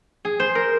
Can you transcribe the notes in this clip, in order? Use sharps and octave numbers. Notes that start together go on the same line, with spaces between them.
G#4
C5
A#4